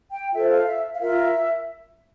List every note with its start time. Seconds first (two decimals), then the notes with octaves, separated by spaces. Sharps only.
0.11 G5
0.33 F4 A4 C5 E5
0.50 F5
0.67 E5
0.94 F5
1.01 F4 A#4 E5